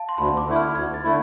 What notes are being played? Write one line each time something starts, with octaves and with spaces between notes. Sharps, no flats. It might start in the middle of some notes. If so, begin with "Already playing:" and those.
Already playing: F5 A5
C6
D2 B5
D6
D3 A3 E4
F6
D2 G#6
A6
D3 A3 E4